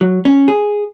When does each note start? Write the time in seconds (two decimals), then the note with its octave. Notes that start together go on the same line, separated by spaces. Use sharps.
0.01 F#3
0.25 C#4
0.48 G#4